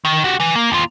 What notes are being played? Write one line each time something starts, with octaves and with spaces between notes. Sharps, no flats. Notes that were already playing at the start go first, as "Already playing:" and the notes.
D#3
F#4 G4
E3
A#3
D#2 F4